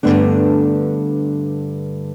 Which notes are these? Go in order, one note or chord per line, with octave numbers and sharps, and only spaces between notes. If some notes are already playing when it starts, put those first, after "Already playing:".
G2 A#2 D3 A3 B3 D4